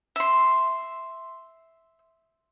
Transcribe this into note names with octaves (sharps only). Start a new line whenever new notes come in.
E5 C6